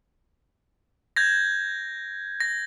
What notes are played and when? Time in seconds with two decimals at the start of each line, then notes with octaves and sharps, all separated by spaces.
1.16 G6 G#6 A#6
2.40 A#6